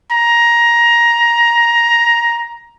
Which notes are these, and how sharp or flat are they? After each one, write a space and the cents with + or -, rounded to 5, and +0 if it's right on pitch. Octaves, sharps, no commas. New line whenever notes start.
A#5 +15